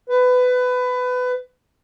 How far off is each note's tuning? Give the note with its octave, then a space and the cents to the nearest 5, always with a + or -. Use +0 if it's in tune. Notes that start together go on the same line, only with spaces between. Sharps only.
B4 +20